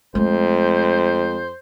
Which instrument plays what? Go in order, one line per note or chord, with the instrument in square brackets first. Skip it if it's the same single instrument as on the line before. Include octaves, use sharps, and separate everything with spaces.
[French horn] F2 [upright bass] G#3 A3 [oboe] C5